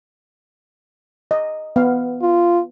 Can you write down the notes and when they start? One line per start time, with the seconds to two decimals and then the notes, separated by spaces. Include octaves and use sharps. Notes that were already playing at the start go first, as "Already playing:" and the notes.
1.31 D#5
1.76 B3 F5
2.22 F4